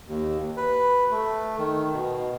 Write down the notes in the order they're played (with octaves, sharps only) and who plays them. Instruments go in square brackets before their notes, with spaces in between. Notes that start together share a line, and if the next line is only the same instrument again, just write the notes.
[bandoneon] D#2
B4
A3
D#3
B2